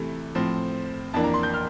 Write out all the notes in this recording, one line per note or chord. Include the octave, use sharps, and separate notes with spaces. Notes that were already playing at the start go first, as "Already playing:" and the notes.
Already playing: C3 E3 A3 E4
A2 F3 C4
F2 E3 A#3 D4 A5
A#5
C6
G6
F6